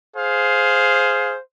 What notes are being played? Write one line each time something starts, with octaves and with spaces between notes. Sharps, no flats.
G#4 C5 F5